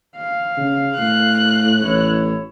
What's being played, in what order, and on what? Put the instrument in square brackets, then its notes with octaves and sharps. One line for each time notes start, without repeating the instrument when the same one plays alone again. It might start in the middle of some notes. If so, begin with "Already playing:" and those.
[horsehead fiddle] F5
[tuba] C#3
[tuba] A2 [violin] F#6
[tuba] A1 [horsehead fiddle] E4 C#5